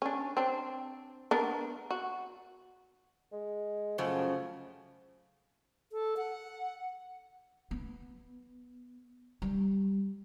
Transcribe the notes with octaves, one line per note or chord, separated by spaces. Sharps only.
C#4 D4
C4 D4
B3 D4 A#4
F#4
G#3
F#2 C#3 F3 A3
A4
F#5
B3
G3